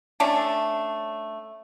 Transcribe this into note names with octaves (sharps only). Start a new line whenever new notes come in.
A3 C#4 D4 E5